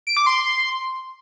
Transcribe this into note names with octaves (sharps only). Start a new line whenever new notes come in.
D7
D6
C6